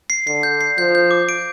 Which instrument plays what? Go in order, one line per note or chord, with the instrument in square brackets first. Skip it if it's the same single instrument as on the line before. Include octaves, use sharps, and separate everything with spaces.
[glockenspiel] C7
[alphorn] D3 [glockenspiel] C7
[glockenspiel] G6
C7
[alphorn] F3 [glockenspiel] G6
[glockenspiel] G6
D6
D7